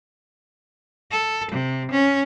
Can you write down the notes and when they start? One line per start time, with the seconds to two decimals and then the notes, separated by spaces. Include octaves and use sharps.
1.12 A4
1.52 C3
1.91 C#4